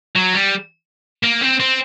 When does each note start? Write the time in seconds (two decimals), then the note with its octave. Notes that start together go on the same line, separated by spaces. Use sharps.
0.16 F#3
0.34 G3
1.24 A#3
1.42 C4
1.60 C4